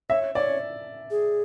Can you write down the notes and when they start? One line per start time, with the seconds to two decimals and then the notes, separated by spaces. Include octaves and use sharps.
0.10 C#5 E5
0.35 C#5 D5
1.11 G#4